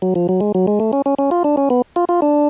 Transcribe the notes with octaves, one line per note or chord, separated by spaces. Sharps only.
F#3
F3
F#3
G#3
F#3
G#3
A3
C#4
C#4
C#4
F4
D4
C#4
B3
F4
F4
D4